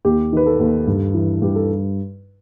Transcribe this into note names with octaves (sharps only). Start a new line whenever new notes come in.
D#2 G4
D#3 B4
A4
D#2
G2
E3
G2 G4
A4